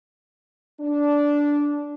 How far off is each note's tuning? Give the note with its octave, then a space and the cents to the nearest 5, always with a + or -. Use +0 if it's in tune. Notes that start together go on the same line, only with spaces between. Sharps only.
D4 -10